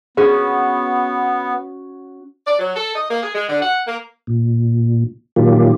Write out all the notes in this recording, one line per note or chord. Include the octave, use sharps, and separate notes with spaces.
B3 C#4 F#4 G#4
D5
F#3
A4
D#5
A#3
G#4
G#3
D3
F#5
A#3
A#2
A#2 D#3 F#3 A#3 F4 G4